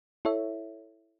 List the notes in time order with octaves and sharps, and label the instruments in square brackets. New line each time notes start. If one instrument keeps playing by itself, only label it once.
[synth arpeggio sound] E4 A4 C#5 E5